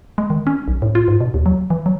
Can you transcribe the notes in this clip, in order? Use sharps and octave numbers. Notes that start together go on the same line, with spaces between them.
G#3
D#3
C#4
B1
A2
F4
G#2
B2
D#2
F#3
E3
F#3